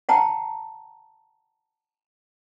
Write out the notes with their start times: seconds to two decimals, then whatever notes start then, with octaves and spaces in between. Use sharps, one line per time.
0.09 F#5 G5 A5 A#5